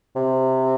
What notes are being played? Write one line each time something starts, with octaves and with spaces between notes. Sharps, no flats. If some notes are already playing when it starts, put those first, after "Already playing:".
C3